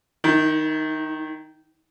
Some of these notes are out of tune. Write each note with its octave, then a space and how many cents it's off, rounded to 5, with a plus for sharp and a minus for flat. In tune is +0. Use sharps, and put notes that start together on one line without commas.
D#3 +0 E4 -45